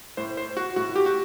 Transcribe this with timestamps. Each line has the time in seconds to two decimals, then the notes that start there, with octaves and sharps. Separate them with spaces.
0.17 A2 C5
0.37 C5
0.57 F#4
0.76 A2 F#4
0.96 G4
1.06 F#4